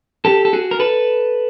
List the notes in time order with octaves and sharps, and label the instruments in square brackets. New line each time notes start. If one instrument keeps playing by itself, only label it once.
[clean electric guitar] G4 A4
A4
F#4 G#4
A#4
A4 B4